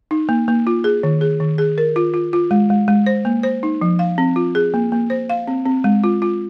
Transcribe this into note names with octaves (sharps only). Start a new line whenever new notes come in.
D#4
A#3
A#3
F4
G#4
D#3
G#4
D#3
G#4
A#4
F4
F4
F4
G#3
G#3
G#3
C5
A#3
C5
D#4
F3
F5
C4
F4
G#4
A#3
A#3
C5
F5
C4
C4
G#3
F4
F4